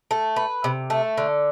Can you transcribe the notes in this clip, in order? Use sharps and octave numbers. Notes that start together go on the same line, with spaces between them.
A3
B4
C3
A3
D3